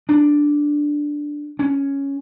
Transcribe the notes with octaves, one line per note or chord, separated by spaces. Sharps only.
D4
C#4